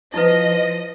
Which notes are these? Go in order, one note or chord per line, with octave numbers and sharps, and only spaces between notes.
F3 D#4 E4 B4 D#5